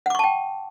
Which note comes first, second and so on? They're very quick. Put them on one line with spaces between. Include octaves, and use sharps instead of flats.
F#5 D6 C#6 A5 G5